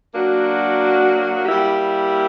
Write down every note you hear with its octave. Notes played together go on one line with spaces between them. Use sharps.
F#3 A#3 D4 F#4
G3 A#3 E4 G4